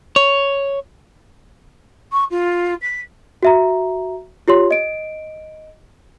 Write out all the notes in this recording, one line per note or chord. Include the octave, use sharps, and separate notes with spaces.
C#5
C#6
F4
B6
F#4 E5 A#5
F4 G4 C#5 C6
D#5 D7